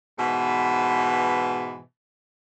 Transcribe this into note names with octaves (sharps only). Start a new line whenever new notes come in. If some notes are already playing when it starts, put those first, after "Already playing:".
G#2 B2 E3